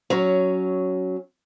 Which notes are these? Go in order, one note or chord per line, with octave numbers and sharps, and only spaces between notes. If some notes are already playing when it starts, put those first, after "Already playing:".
F#3 C#4